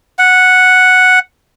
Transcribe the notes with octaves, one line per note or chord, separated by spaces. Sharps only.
F#5